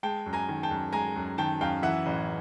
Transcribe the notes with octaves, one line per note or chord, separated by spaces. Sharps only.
G#3 G5 A5
F#2
G#5 A#5
D#3
G5 A5
F#2
G#3 G#5 A#5
F#2
D#3 G5 A5
F#2 F5 G5
E3 E5 F#5
A1